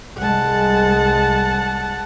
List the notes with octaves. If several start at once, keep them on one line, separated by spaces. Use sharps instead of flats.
C2 G#3 F#5 A5